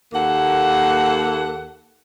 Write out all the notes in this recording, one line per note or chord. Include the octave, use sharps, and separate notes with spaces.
D#2 A#3 A4 F#5